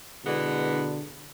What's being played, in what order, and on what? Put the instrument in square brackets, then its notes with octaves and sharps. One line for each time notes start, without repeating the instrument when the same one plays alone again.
[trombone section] B2 D3 [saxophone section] E3 G#3 B3